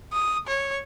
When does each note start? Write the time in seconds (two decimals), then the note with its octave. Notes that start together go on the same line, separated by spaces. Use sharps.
0.13 D#6
0.47 C#5